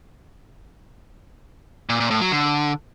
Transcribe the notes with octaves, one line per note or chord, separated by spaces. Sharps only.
A#2
A#2
A2
F#3
D3